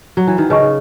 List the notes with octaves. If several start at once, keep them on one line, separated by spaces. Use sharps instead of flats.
F#3
E3
D#3
C#3 B4 D#5 A5 C#6